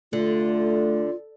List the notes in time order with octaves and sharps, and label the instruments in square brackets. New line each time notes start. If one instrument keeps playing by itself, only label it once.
[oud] D3 [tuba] A3 [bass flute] F4